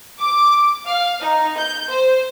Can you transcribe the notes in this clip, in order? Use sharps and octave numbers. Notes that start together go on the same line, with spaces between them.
D6
F5
D#4
G6
C5